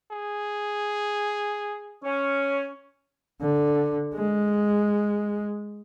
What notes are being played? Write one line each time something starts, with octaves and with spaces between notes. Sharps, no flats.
G#4
C#4
D3
G#3